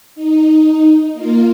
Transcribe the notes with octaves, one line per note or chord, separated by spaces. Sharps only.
D#4
A#3 F4